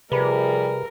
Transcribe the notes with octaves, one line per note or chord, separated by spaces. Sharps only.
C3 F3 G3 G#4 A#4 B4 B5